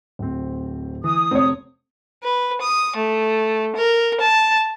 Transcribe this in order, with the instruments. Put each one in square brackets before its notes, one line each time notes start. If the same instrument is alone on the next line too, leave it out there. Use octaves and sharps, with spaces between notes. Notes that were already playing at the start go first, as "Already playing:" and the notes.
[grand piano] D1 C4
[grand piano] E3 [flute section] D#6
[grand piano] F1 [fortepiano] C4 C#5
[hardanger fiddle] B4
D#6
A3
A#4
A5